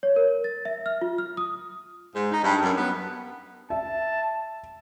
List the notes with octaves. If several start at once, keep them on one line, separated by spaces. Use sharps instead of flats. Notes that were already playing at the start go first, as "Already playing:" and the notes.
C#5
A#4
A6
E5
F6
F4
F6
D#6
G#2
D#4
G2
F#2
B3
E5 A5